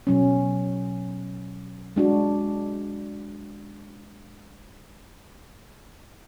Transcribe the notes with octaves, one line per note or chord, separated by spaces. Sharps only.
B2 F#3 C#4
G#3 D4 F#4